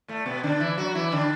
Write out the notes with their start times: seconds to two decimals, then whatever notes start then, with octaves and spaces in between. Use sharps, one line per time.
0.08 A2 A3
0.26 B2 B3
0.43 D3 D4
0.60 E3 E4
0.78 F#3 F#4
0.95 E3 E4
1.13 D3 D4